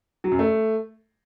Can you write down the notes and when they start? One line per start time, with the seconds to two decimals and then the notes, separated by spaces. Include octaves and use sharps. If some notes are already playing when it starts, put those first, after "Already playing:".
0.24 F#3
0.32 F#2
0.39 A3